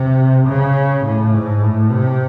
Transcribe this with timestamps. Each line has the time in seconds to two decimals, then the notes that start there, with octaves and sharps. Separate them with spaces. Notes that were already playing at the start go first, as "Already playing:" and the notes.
Already playing: C3
0.47 C#3
1.05 A2
1.34 G#2
1.63 A2
1.91 C3